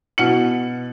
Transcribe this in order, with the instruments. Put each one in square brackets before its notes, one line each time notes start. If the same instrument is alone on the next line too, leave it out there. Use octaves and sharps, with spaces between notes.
[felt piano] B2 C#7 [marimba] E4 F#5 F6